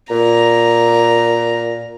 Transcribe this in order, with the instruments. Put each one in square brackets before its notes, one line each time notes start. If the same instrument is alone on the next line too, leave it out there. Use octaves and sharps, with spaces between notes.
[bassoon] A#2 [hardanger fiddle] A#5